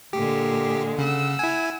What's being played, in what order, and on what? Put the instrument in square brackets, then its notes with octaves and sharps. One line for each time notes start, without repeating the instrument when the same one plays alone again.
[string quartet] A#2 G#3 [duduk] D3 [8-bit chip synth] G4
[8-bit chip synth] C#3 [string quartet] F#5 E6
[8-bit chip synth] E4 G#5